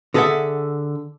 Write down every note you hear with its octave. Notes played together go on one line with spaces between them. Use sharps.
D3 G#4 A4 B4 E5 F#5